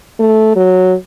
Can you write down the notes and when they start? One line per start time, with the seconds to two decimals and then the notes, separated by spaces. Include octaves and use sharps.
0.19 A3
0.56 F#3